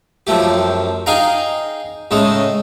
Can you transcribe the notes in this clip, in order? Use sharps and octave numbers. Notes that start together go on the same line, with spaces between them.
F#2 F3 A3 G4
D#4 G#4 F5 G5 A#5
A2 C#3 G#3 D#4